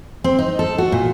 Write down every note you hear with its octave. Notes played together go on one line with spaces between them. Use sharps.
C4
D#4
A4
F#4
A#2